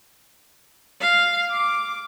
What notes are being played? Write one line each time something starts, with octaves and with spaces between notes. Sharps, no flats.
F5
D6